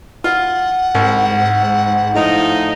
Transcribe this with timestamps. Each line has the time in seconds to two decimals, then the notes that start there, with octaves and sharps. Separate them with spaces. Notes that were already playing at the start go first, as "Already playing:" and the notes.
0.24 F4 F#5
0.95 C2 G#2
2.15 A2 F3 D#4